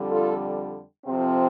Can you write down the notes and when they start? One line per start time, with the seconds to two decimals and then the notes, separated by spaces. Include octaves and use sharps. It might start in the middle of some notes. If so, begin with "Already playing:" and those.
Already playing: F2 D3 G3
0.11 F4 A4
1.06 F2 C3 F3 C4